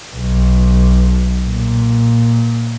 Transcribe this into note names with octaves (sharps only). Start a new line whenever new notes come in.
B1
A#2